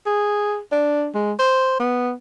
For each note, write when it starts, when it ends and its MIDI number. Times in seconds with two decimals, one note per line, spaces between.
0.07 0.59 68
0.72 1.09 62
1.15 1.32 56
1.39 1.79 72
1.80 2.12 59